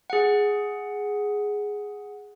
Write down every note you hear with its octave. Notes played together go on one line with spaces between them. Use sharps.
G#4 F#5